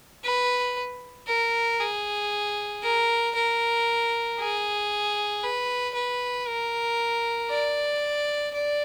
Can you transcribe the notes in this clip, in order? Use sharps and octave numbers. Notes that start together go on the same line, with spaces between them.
B4
A#4
G#4
A#4
A#4
G#4
B4
B4
A#4
D5
D5